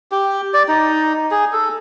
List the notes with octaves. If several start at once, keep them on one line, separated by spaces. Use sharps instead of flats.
G4
D5
D#4
G#4
A4